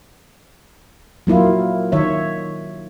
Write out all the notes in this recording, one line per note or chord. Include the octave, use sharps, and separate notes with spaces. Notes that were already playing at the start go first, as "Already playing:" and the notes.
F#3 A#3 E4 F4
D#3 C#5 E5